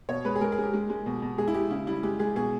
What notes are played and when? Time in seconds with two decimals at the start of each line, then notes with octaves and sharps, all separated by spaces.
0.09 B2 C#5
0.25 G#3 B4
0.35 G#4
0.41 G#3 A#4
0.52 G#4
0.58 G#3
0.63 G4
0.74 G#3
0.90 G#3
1.06 B2
1.22 B2
1.38 G#3 G#4
1.48 E4
1.54 G#3 G4
1.70 C#3 E4
1.87 G3 E4
2.03 G#3 G4
2.19 G#3 G#4
2.36 B2 G#4